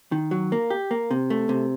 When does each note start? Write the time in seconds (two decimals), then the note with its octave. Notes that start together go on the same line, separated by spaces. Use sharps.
0.12 D#3
0.31 F#3
0.52 A#3
0.70 G4
0.91 A#3
1.11 C3
1.30 A3
1.49 C3